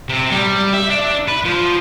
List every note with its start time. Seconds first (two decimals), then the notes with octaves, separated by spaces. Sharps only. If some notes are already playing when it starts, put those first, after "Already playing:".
0.09 C3
0.32 G3
0.74 E5
0.90 D4
1.28 B4
1.44 F3